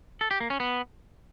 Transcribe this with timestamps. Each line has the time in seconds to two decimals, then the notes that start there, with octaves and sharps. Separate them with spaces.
0.21 A4
0.31 G4
0.40 A#3
0.50 C#4
0.60 B3